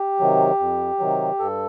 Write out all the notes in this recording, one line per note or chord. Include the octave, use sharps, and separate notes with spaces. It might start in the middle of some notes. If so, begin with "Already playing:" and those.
Already playing: G4
C3 D#3 F#3
F2
C3 D#3 F#3
G2 A4